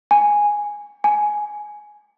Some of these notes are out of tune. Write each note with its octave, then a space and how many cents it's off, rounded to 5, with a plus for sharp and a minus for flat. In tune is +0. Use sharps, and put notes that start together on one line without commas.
G#5 -5
G#5 +10